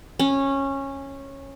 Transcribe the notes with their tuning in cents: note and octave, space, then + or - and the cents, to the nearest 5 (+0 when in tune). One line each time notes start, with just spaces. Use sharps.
C#4 -15